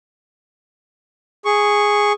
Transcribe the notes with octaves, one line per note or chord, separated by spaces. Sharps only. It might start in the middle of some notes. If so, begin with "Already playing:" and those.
G#4 C#6